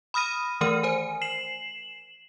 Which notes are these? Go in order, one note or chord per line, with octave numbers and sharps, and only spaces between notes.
B5 D#6 F6 A#6 D#7
D#3 E3 A3 A#4 F6 D#7
C5 G#5
C7 E7 F#7